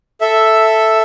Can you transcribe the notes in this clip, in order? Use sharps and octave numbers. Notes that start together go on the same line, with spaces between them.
A4 E5